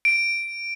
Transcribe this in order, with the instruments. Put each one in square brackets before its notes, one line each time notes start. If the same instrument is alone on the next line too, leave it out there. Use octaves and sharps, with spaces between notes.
[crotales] D7